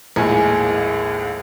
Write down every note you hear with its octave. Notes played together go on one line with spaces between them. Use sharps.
A#1 D#2 A2 G#3 G#5